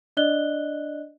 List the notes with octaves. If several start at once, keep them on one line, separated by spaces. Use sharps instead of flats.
D4 D5 D#5 F#6 G7